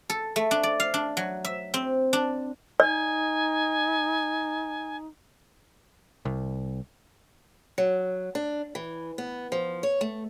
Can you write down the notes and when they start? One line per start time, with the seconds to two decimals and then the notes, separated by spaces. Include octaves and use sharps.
0.10 A4
0.36 A3
0.51 D4
0.63 D5
0.80 F5
0.94 D4
1.17 F#3
1.45 E5
1.74 C4
2.13 D4
2.80 D#4 D5 G#5
6.25 C2
7.78 F#3
8.35 D4
8.75 E3
9.18 B3
9.52 F3
9.83 C#5
10.01 A3